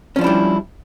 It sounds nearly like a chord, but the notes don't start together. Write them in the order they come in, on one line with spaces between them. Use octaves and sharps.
C#4 F3 D4 E4 G3